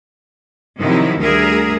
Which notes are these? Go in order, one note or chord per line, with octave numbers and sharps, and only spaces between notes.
C3 D#3 F3 F#3 D#4 E4
D2 G3 G#4 A#4 E5